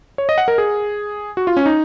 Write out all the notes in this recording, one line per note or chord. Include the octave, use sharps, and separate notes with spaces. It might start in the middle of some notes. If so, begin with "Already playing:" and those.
C#5
D#5
F#5
A#4
G#4
F#4
F4
C#4
D#4